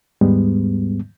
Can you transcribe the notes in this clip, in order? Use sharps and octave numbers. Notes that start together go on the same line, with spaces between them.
D#2 G#2 G3 G#3 B3